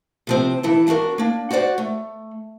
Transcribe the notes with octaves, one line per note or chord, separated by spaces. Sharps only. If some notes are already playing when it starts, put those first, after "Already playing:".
C3 F3 C4
E3 E4 A5
B3 D4 F4 F#4 A#4
A#3 D4
F#4 C5 D5 E5 F#5
A3